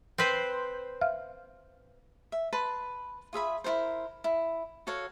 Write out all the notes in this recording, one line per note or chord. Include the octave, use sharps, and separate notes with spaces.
C4 B4 C5
E5 F5 F6
E5
B4 A5 C6
F4 G#4 E5 B5
E4 F#4 A#4 C5
E4
F#4 A4 C#5 F5